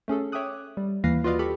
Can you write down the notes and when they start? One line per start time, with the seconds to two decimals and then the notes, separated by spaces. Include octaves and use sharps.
0.08 A3 C#4 G#4 A4
0.32 C#5 E5 G5 D6 D#6 F#6
0.77 G3
1.04 D#2 E3 B4 F5 A#6 C7
1.24 F4 F#4 B4 D5 D#5 F5
1.39 G4 A4 B5 C#6